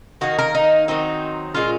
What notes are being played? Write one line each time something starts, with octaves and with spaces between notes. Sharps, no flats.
D#3 A#3 D#4 F#4
A#4
D#4
D#3 F#3 C4 D#4
A#2 G#3 C#4 F4